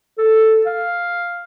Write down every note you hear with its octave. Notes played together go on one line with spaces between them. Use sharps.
A4
F5